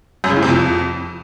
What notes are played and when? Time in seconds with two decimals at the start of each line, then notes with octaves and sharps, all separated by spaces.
0.24 F#2
0.30 C#3
0.36 A2
0.43 C3
0.49 F2